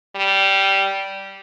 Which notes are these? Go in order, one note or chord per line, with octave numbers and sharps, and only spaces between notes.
G3